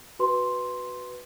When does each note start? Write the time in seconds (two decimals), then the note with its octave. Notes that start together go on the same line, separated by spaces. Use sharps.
0.19 F#4 B4 C6